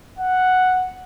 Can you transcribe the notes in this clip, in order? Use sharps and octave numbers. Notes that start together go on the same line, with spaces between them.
F#5